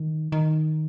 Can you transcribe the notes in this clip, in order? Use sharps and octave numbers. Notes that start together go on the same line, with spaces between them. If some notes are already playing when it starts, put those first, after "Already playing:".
Already playing: D#3
D#3